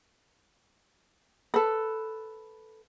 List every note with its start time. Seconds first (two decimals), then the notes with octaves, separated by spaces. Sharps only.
1.54 A4 B4